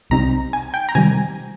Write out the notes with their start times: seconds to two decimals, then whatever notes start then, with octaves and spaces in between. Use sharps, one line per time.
0.10 C2 C3 G3 C4 D#4 A#5
0.53 G#5
0.74 G5
0.89 A#5
0.95 C3 D#3 G3 G#5